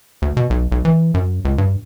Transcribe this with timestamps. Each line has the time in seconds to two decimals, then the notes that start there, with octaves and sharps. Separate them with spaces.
0.22 D2
0.37 B2
0.50 B1
0.72 B1
0.85 E3
1.14 F#2
1.45 C#2
1.58 G2